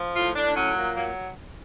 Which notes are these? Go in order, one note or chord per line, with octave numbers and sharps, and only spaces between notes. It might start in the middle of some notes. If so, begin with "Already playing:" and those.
Already playing: F3
A2 F4
A2 D4
F#3 C#4
A#2
F#3 A#3